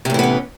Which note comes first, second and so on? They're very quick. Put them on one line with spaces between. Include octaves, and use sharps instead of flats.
C3 A2 E3 B3 C#4